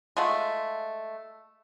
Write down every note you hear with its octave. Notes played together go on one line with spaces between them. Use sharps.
G#3 A3 F4 F#5